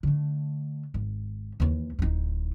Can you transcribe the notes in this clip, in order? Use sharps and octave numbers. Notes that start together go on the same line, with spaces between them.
D3 A3
G#1
D#2 E3
D1 D#4